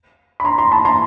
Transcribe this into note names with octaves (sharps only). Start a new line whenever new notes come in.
B5
A#5 C6
A#5 C6
A5 B5
A#5 C6